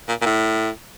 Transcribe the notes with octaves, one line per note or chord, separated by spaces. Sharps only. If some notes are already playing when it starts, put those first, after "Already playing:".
A#2
A#2
A2